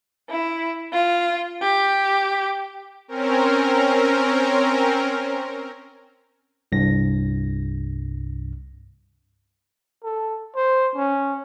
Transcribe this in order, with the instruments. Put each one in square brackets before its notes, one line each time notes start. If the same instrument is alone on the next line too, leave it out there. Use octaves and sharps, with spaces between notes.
[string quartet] E4
F4
G4
[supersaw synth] C4 C#4 A#4
[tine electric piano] C2 G2 A#6
[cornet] A4
C5
C#4